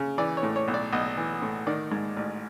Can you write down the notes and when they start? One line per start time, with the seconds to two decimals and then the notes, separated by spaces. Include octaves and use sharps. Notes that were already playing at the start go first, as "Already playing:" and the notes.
Already playing: C#3
0.18 E3 D5
0.37 C#5
0.43 A2
0.56 C#5
0.68 B1
0.74 D5
0.93 B1 D#5
1.17 E3
1.42 A2
1.67 D#3 D5
1.92 G#2
2.16 A1